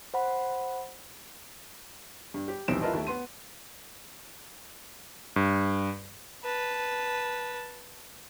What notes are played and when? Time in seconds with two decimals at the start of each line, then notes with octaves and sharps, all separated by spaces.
0.14 C5 F#5 B5
2.34 G2
2.48 G4
2.68 D#1 B1 E3 C4 D7 E7
2.81 E4 F4 A#4 B4 D#5 A5
2.93 D#2 A3
3.07 B3 C6 D#7
5.36 G2
6.44 B4 A5